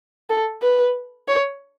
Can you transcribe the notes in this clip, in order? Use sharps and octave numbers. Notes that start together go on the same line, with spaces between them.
A4
B4
C#5